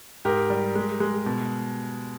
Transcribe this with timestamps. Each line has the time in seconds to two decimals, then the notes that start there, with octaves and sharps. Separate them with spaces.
0.25 G#2 G4 A#4
0.50 G3
0.75 G#3
1.00 G#3
1.26 B2